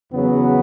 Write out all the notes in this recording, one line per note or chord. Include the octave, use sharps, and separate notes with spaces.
E2 C#3 F#3 B3